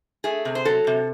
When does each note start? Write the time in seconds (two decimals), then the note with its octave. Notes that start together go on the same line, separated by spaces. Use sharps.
0.24 A3 G#4
0.45 C3
0.55 C5
0.65 F#3 A4
0.87 C3